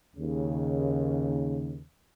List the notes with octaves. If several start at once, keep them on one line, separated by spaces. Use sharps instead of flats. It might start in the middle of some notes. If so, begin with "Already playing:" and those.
D#2 C#3